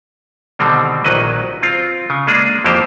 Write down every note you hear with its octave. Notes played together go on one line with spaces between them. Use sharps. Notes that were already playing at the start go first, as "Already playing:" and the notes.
B2 D3 D#3 G3 C4
A#1 D#3 F#3 B4 D#5
C4 F4
C#3
G#3 A#3 D4 G#4
F2 E3 F3 A#3 G4 C5